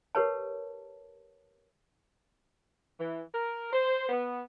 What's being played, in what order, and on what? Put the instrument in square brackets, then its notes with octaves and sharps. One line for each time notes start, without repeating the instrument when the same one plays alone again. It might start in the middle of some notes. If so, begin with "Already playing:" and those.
[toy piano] G4 A#4 B4 C#5 A5
[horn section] E3
A#4
C5
B3